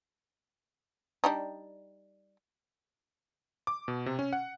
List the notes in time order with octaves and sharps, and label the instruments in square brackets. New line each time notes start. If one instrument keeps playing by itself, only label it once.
[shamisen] G3 D4 D#4
[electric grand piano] D6
B2
C3
C#4
F#5